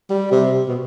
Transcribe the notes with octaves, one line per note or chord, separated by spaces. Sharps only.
G3
C3
B2